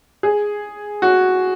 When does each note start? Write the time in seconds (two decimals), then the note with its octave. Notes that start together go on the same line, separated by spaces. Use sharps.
0.23 G#4
1.02 F#4